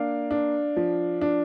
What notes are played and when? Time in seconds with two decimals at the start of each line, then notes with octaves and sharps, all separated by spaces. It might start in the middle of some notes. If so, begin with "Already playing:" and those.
Already playing: A#3 D4 F5
0.31 D4
0.77 F3
1.21 D4